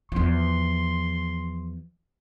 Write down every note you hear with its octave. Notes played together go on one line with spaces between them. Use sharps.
E2 F3 C6